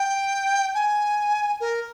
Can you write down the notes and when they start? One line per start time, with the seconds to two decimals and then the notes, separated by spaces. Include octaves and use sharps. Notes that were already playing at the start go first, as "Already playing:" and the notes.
Already playing: G5
0.75 G#5
1.61 A#4